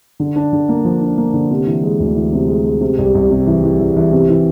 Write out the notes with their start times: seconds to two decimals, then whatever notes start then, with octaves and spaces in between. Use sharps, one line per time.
0.20 D3
0.36 D4
0.53 D3
0.69 A#3
0.85 F3
1.02 D4
1.18 A#3
1.34 D3
1.50 C3
1.67 E3
1.83 G#3
2.00 D2
2.16 E3
2.33 C3
2.48 G#3
2.65 G#3
2.81 C3
2.98 C2
3.15 C2
3.30 C3
3.47 E3
3.63 E3
3.79 E3
3.96 E3
4.12 C3
4.29 E3